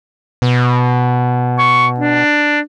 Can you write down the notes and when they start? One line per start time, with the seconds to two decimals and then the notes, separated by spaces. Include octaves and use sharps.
0.42 B2
1.58 C#6
1.99 D4